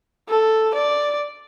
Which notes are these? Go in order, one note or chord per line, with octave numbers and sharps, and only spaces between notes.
A4
D5